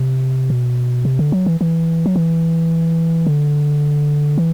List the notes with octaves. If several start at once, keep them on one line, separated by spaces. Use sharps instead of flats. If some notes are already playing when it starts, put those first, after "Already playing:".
Already playing: C3
B2
C3
D3
F#3
E3
E3
F#3
E3
D3
E3